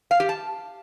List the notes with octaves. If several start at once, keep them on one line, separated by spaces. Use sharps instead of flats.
F5
G4
A5